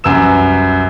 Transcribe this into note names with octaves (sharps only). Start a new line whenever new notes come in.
C2 F#2 B4 E6 E7